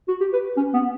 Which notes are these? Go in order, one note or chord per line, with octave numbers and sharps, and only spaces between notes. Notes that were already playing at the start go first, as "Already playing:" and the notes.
F#4
G4
B4
C#4
B3